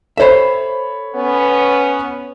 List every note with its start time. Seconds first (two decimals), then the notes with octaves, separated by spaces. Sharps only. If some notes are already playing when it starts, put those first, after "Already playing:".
0.17 A4 C5 C#5 E5 B5
1.15 B3 C#4